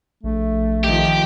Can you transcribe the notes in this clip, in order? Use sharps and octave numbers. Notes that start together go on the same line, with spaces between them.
A#1 A3
D#3 F3 G4